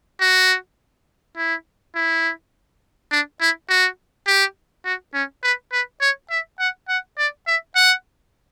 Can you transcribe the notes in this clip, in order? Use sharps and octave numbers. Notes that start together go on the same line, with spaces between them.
F#4
E4
E4
D4
E4
F#4
G4
F#4
C#4
B4
B4
C#5
E5
F#5
F#5
D5
E5
F#5